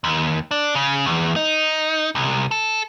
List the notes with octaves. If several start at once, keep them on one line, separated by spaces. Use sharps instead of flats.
D#2
D4
C#3
E2
D#4
C2
A4